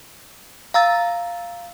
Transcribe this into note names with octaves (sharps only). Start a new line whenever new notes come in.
F5 A#5 E6 A6